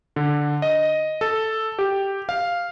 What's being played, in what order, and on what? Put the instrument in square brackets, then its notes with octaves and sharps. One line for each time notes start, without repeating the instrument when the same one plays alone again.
[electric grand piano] D3
D#5
A4
G4
F5